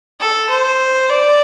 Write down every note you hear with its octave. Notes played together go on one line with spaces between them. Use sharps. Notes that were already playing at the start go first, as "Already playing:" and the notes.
A4
C5
D5